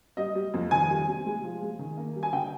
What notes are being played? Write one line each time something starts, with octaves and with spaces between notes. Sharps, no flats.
G3 D#5
G3
F2
D#3 G#5
G3
C3
G#3
F3
G#3
D#3
A#3
G3
G#5
D3 G5